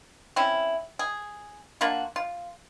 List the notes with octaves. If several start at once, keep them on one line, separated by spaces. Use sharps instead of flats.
C4 C#4 E4
G#4
A#3 D4 F4 F#4
F4